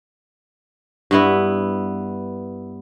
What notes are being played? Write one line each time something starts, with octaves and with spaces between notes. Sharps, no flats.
G2 B3 E4